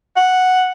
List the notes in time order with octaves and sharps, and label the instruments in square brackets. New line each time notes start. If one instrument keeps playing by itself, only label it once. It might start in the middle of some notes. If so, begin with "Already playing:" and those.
[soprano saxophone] F#5